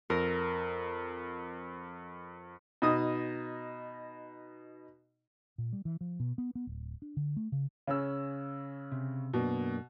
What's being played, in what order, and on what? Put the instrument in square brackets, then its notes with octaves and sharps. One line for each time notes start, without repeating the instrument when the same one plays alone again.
[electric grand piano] F2 [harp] A#4
[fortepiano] B2 D#4 D#6
[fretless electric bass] A#2
G3
E3
F3
B2
B3
B3
D1
D4
D3
A3
C#3
[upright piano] C#3 C#4 E6
[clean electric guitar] C3
[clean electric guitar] F#2 A#3 D4 [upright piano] B2